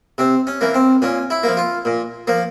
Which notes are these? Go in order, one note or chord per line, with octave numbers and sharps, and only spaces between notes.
C3 C4
C#4
E3 A#3
C4
A#2 C#4
E4
F3 A#3
F4
A#2
F3 A#3